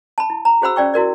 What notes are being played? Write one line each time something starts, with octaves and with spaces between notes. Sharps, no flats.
A5 B5
E4
A#5
F#4 G#4 C5 F#5 B5 E6
C#4 D5 G5 C#6
E4 F#4 A#4 D5